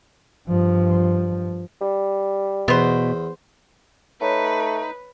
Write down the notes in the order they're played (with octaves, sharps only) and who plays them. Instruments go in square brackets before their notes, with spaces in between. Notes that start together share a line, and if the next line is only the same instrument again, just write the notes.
[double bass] G2 F3
[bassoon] G3
[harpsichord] E2 [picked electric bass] B2 [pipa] B3 C5
[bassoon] A3 [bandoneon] D#4 [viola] B4 [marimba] C#5